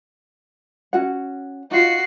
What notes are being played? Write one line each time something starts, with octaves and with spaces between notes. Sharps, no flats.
C#4 F#4 F#5
D#4 F4 F#4 C7